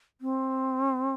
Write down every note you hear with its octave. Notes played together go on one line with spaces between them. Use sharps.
C4